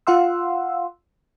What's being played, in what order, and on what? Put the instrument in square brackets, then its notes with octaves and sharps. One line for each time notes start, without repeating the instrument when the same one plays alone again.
[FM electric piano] F4 F5 F#5 C6 E6